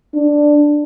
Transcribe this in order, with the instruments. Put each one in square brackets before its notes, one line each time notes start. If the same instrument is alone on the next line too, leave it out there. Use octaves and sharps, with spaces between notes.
[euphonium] D4